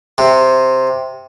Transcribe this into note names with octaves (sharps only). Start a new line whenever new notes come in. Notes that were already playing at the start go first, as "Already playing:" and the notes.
C3